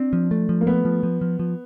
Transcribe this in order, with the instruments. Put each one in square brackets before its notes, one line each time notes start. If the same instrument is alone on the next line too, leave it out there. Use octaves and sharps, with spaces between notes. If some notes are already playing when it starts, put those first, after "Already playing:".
Already playing: [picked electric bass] C4 [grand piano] D4
[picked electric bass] F3
A3
F3
[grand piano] A#3
[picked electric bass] A3 [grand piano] B3
[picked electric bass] F3
F3
F3
F3